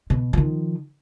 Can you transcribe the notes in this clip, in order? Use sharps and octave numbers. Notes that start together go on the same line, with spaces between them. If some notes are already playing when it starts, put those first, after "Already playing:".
B2
D#3 F3